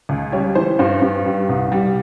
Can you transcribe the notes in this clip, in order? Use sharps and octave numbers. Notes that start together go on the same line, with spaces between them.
C#2
G3 C#5
E3 C5
G2 C5
G2
G3
C2
G3